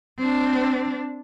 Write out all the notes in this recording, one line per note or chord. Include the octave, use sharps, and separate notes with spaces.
C4 D4